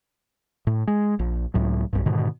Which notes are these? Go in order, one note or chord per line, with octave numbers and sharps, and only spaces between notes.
A2
G#3
A#1
C#2 A2 F#3
B1 G2
G#2 B2 D3 D#3